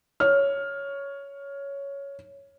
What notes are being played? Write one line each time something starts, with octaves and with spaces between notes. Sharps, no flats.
C#5 F6